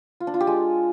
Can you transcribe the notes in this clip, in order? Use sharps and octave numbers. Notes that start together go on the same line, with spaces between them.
F4
D4
F4
G4
G#3